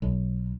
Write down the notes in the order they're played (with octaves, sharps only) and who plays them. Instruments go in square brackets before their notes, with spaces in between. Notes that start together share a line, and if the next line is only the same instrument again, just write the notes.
[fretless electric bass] B1